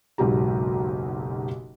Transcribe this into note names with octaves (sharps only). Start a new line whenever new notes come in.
F#1 B1 G#2 F#3 G4 A#5